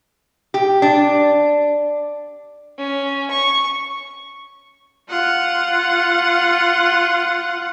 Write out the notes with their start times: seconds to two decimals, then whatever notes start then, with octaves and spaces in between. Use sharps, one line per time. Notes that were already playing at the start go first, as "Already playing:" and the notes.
0.54 G4
0.82 D4
2.78 C#4
3.31 C#6
5.08 F4 F#5